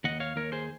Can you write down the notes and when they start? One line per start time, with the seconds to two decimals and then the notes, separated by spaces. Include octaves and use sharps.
0.04 D#2 D#5 F#5
0.20 C#5 F5
0.36 D#2 A#4 C#5
0.52 G#4 C5